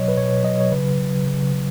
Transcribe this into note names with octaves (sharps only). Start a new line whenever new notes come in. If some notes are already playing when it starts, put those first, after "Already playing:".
Already playing: B2 F#3 C#5 D#5
B4
B2 C#5
F#3 D#5
C#5
C#3 B4
F#3
C#3
F#3